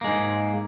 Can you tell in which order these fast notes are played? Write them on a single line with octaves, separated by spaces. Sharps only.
A#3 G#3 G#2